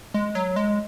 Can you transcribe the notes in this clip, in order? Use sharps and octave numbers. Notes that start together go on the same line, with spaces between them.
G#3
F#3
G#3